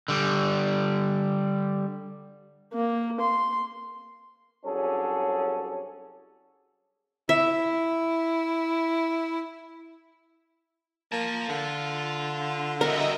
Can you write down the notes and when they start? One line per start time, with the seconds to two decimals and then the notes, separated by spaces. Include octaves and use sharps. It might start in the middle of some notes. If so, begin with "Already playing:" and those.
0.08 D3 G3
2.73 A#3
3.20 C6
4.65 C2 F#3 C#4 D4 G#4 A4
7.29 E4 E5
11.12 A#3 F4 A5
11.49 D3
12.81 G3 F#4 A#4 D#5 E5 A#5